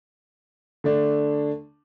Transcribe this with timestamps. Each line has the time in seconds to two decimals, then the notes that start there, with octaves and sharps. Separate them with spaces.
0.84 D3 A3 D4